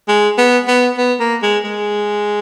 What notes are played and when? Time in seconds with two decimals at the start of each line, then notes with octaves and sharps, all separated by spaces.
0.08 G#3
0.38 B3
0.68 B3
0.98 B3
1.20 A#3
1.43 G#3
1.65 G#3